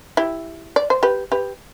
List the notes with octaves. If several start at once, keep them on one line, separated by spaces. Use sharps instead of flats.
E4 G4
D5
C5
G4 B4
G4 B4